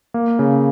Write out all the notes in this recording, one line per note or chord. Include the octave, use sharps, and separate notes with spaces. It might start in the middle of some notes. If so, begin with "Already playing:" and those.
A#3
C#3